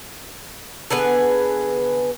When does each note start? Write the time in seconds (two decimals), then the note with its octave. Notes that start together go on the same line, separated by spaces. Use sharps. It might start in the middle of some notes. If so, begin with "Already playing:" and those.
0.90 D3 B3 G#4 B4